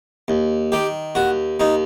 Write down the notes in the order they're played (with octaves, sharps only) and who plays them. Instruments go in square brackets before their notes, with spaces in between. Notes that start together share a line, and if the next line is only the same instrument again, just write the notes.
[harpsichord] D#2
D#3 G4
D#2 F#4
D#2 D#4